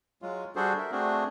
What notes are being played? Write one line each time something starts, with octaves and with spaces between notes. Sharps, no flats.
F#3 G#3 F4
G3 D4 F#4 G#4 A4 C5
A#4 E5
A3 C4 D4 F#4 G#4